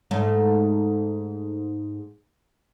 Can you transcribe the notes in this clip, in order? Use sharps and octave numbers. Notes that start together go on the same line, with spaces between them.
G#2 A3